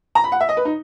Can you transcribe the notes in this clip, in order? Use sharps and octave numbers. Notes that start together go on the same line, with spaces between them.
A#5
B5
F#5
E5
D#5
B4
D#4